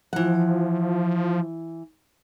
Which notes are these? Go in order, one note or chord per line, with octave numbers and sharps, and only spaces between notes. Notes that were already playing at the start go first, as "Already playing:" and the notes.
E3 F3 F#5